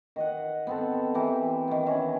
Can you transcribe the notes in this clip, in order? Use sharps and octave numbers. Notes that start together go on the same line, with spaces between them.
D#3 D#5 F#5
B3 C4 A4
E3 G4 A#4
D#3 B3
D#3 E3 C#4